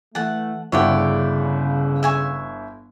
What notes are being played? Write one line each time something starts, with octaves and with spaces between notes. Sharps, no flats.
E3 A3 F#5 A5
G1 C#3 E4 C#5 D5 F#5 G5
E5 G#5 C#6